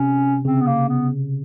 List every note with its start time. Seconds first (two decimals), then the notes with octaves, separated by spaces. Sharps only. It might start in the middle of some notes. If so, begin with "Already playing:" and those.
Already playing: C3 C#4
0.45 C#3 C4
0.61 B3
0.67 A#3
0.89 B3